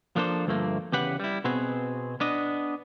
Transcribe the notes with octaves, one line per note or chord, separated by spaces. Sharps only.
F3 A#3 D4 A4 C5
D2 G2 F3 A3 A#3
E2 C#3 G4 B4 F#5
G3 E4
B2 B3 C4 F#4 G#4
B3 D4 D#5